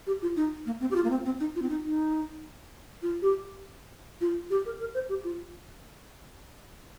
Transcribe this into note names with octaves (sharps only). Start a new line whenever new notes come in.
G4
F4
D#4
A#3
C4
G4
F4
A#3
C4
C4
D#4
F4
C4
D#4
D#4
F4
G4
F4
G4
A#4
A#4
C5
G4
F4